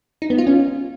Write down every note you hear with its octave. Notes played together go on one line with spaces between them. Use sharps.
D#4
B3
F4
C#4